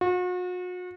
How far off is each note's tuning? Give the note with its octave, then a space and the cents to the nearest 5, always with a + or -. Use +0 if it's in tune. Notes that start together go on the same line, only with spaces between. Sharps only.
F#4 -40